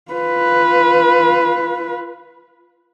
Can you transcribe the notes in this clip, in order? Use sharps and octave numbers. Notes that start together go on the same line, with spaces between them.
F4 B4